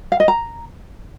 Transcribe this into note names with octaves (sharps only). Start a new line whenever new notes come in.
F5
D#5
A#5